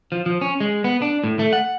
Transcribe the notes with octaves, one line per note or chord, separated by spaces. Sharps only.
F3
F3
C#4
G#3
B3
D4
A2
A3
F#5